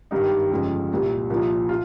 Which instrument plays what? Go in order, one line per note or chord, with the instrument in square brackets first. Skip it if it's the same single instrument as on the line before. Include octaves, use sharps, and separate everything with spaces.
[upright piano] G#1 G2 D#3 G3 D#4 G4
G1 F2 C#3 F3 G#3
C2 A#2 G3
C2 A#2 F3
F4